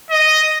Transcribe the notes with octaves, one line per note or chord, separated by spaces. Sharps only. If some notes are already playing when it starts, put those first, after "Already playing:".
D#5